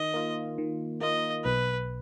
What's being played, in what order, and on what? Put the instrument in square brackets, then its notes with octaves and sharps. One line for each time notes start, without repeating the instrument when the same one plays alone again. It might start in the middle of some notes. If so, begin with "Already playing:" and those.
Already playing: [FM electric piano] D#3 [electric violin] D#5
[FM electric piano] A#3 F4
D#3
[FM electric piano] A#3 F4 [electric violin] D#5
[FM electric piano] B1 [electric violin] B4